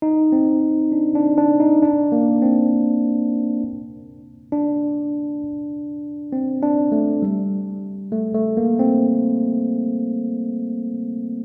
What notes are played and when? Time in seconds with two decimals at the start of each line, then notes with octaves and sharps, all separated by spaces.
0.02 D#4
0.32 C4
0.92 D4
1.15 D4
1.38 D4
1.60 D#4
1.83 D4
2.12 A#3
2.42 C4
4.52 D4
6.33 C4
6.63 D4
6.92 A3
7.22 G3
8.12 A3
8.34 A3
8.57 A#3
8.79 C4